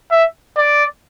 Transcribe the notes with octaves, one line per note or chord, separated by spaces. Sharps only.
E5
D5